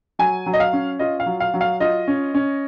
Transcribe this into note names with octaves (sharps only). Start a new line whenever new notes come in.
F#3 G#5
F#3
D#5
F5
C#4
F4 D#5
F5
F#3
F5
F#3
F5
F4 D#5
C#4
C#4